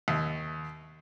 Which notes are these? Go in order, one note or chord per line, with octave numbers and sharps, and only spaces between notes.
D#2